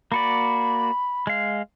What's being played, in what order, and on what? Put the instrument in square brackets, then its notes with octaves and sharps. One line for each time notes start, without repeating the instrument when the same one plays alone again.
[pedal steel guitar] A#3 F#4 D5 [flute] B5
[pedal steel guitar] G#3 F5